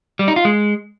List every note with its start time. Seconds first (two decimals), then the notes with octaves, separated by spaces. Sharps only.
0.19 G3
0.28 D#4
0.36 F4
0.45 G#3